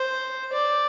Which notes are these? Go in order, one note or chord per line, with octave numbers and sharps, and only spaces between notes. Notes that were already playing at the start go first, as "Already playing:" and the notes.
Already playing: C5
D5